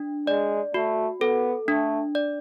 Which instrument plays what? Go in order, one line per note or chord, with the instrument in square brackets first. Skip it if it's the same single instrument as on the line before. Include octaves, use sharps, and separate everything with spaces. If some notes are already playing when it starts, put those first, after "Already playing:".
Already playing: [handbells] D4
[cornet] G#3 [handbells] D5
[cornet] A3 [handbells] F#4
[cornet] B3 [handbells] A4
[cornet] A3 [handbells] D4
[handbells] D5